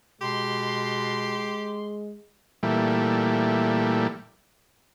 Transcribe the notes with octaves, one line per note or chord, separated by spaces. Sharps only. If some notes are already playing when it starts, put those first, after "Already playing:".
B2 G#3 G4 C6
A#2 E3 G3 A3